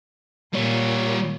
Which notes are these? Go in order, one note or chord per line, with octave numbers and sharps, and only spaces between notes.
A#2 G3 C#5